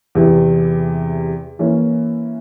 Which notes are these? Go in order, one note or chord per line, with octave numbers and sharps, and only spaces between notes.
E2 C3 E3
E3 A#3 C#4